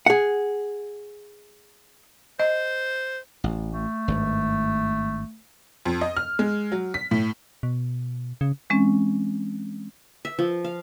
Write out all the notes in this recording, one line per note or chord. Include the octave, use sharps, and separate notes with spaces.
G#4 F#5
C5 D#5
A1
A3
G#1 G2
F2
D#5
F6
G#3
F#3
B6
A2
B2
C#3
E3 G#3 C4 C#4
E5
F3
F5